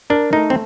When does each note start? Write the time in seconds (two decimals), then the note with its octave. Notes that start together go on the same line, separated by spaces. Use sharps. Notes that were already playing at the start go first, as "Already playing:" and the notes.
0.10 D4 A#4
0.32 A3 D#4
0.50 C4